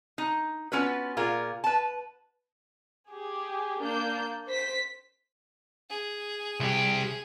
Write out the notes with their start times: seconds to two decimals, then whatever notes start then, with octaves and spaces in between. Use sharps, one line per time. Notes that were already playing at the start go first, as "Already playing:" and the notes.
0.18 D#4
0.72 B3 C#4 F4 F#4 B4
1.17 A#2 F4 G#4 A#4
1.64 B4 A5
3.11 G4 G#4
3.81 A#3 D4 G6
4.48 C5 B6
5.90 G#4
6.60 C2 G4